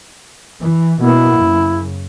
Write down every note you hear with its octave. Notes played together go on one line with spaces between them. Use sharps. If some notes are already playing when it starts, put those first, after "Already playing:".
E3
B2 A#3 B3 E4
F#2 C#3